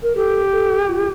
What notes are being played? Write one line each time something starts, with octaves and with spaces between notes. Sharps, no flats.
A#4
G4 A4
A4
F4